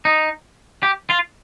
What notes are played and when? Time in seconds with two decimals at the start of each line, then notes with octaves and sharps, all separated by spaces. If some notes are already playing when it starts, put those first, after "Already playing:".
0.05 D#4
0.83 G4
1.10 F4